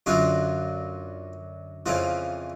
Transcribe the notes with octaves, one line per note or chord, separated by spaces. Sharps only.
F#2 D3 F#3 F4
F2 C#3 E3 F4